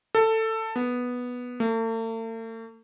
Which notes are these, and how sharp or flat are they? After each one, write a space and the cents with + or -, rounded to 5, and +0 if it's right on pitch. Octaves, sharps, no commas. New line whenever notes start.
A4 +15
B3 -5
A3 +45